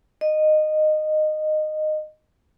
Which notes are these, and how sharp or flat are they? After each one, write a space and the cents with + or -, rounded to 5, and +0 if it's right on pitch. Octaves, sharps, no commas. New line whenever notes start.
D#5 -15